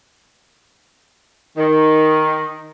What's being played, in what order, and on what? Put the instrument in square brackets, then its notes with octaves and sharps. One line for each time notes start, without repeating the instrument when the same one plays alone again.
[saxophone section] D#3